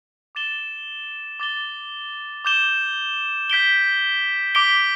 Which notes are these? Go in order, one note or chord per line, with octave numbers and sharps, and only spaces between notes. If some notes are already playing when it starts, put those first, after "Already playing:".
D6 A6 E7 G7
D6 A6 G7
D6 G6 E7 G7
G6 B6 D7 G7
D6 B6 D7 G7